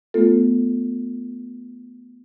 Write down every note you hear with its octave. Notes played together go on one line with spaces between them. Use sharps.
A3 B3 F4 A4